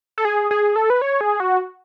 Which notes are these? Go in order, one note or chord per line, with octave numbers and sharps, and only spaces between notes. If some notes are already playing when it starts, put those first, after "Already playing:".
A4
G#4
G#4
A4
B4
C#5
G#4
F#4